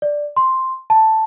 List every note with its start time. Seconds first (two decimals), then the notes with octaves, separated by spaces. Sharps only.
0.02 D5
0.37 C6
0.90 A5